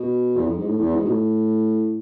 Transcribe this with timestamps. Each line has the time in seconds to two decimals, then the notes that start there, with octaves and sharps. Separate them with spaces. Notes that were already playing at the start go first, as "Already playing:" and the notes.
Already playing: B2
0.37 E2
0.46 F2
0.57 G#2
0.67 A2
0.81 E2
0.95 G#2
1.05 B2
1.09 A2